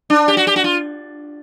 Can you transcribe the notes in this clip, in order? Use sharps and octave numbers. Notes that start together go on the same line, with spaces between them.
D4
G4
F#4
G4
F#4
F4